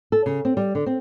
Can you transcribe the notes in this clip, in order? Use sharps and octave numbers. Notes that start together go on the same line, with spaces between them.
A4
C#3
C4
G3
D3
C4